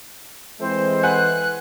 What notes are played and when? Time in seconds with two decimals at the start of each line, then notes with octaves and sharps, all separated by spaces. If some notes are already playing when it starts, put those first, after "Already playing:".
0.60 E3 G#3 A3 C4 C5
1.03 B4 F#5 G#5 F#6